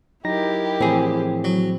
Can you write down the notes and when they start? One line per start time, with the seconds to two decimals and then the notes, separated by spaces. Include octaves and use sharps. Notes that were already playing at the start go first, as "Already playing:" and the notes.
0.25 F#3 D#4 E4 G4 A#4 A#6
0.80 A2 E3 F3 C4 G#4
1.44 F#3